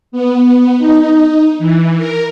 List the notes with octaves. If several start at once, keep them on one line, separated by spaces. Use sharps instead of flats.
B3
D#4
E3
A#4